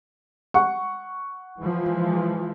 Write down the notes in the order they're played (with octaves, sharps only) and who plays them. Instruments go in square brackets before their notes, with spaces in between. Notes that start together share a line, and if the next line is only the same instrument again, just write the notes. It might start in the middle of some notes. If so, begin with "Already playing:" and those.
[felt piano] F#5 C#6
[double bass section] E3 F3 G#3